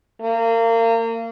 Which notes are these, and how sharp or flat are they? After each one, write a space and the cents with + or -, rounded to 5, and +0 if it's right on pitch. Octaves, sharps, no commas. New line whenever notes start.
A#3 -30